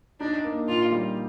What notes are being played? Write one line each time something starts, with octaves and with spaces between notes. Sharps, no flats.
D4 D#4
A#3
A#2 F4
G3